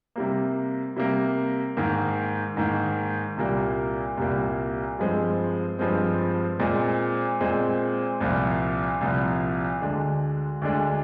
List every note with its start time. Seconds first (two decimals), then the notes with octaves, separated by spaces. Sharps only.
0.16 C3 G3 A#3
0.96 C3 G3 A#3
1.77 G#2 D#3 A#3
2.57 G#2 D#3 A#3
3.37 C2 A#2 G3 A#3
4.17 C2 A#2 G3 A#3
4.99 G2 F3 G#3 C4
5.79 G2 F3 G#3 C4
6.60 A#2 G#3 C4
7.40 A#2 G#3 C4
8.21 C2 A#2 F3
9.01 C2 A#2 F3
9.82 D2 D3 G#3 D4
10.62 D2 D3 G#3 D4